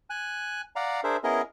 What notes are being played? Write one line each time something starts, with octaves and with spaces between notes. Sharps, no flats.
G#5 F#6
D5 F5 F#5 A#5
D4 G#4 A#4 C5 E5
B3 C#4 E4 G#4 A#4 D#5